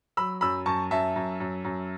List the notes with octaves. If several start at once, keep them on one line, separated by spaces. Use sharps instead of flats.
F#3 B5 E6
F#2 B5 E6
F#2 A5 C#6
F#2 E5 A5
F#2
F#2
F#2